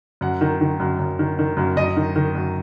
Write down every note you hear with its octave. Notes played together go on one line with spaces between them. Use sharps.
F#2 F#5
D#3
D#3
F#2
F#2
D#3
D#3
F#2
F#2 D#5
D#3
D#3
F#2